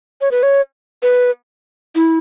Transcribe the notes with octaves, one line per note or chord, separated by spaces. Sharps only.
C#5
B4
C#5
B4
E4